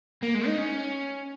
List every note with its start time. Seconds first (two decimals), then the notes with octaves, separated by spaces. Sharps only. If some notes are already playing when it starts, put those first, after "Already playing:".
0.23 A#3
0.35 G#3
0.47 D#4
0.58 C#4